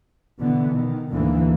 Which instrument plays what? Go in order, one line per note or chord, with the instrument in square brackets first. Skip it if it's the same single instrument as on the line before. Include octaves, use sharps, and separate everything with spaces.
[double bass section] B2 D3 E3 B3
D#3
D2 G#2 D3 E3 A#3